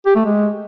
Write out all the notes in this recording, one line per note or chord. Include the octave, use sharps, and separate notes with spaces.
G4
A3
G#3